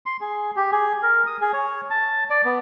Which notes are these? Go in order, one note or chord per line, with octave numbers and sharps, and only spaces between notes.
C6
G#4
G4
G#4
A#4
D#6
G#4
C#5
A5
D5
B3